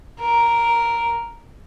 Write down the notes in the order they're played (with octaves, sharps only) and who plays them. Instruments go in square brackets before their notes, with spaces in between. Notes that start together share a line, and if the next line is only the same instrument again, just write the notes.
[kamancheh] A#4